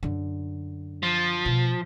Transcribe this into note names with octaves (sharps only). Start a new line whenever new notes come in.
F#2 D3
F3
B2